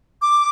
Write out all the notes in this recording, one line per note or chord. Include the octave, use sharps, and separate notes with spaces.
D6